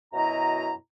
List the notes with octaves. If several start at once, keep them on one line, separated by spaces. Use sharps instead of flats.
F#2 B2 E4 D#5 A#5